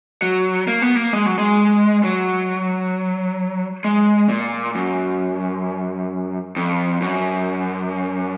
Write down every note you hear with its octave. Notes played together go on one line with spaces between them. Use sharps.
F#3
A#3
B3
A#3
G#3
F#3
G#3
F#3
G#3
A#2
F#2
F2
F#2